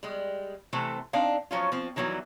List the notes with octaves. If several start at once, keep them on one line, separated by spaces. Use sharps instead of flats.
G3 G#3
C3 E3 A3 C4 A4
C4 D4 D#4 F5
F3 F#3 C#4 F4
F3 C4
D#3 E3 F#3 G3 B3 E4